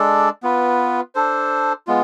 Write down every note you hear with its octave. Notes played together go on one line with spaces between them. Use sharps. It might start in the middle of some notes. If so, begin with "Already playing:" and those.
Already playing: G#3 D4 A4 D5
B3 F4 B4
D4 A4 C5
G#3 B3 F4